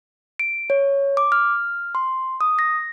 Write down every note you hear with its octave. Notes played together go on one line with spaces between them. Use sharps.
D7
C#5
D6
F6
C6
D#6
A#6